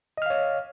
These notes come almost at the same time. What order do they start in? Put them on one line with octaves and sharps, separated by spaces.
D#5 F6 F5 C#5